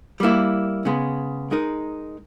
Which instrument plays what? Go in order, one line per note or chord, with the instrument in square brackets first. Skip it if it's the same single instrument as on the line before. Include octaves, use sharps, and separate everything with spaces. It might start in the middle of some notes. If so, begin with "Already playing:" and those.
[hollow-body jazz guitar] G3 A#3 E4
C#3 G#3 B3
G#3 D#4 A#4